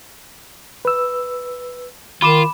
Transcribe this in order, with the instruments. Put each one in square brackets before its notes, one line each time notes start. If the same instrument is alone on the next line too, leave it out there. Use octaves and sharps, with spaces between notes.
[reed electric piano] B4 E6
[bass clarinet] D#3 [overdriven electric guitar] F4 [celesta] B5 D6 E7